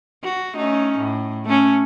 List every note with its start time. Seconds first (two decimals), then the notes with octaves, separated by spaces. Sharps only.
0.23 F#4
0.56 A3 C#4 D#4
0.99 A2
1.45 A3 C#4